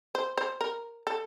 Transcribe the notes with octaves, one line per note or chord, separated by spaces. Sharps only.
C5
C5
A#4
A4